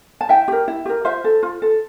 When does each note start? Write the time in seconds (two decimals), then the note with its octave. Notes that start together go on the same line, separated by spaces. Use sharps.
0.21 A5
0.29 E4 E5 G5
0.48 G4 A#4
0.68 E4
0.86 G4 A#4
1.05 F4 C5 E5
1.24 A4
1.43 F4
1.62 A4